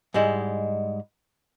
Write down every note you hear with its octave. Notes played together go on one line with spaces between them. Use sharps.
G#2 G3 G#3 E4